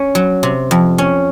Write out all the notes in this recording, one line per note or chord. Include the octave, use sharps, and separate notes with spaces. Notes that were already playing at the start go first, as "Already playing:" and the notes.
Already playing: C#4
F#3
C3
F2
C#4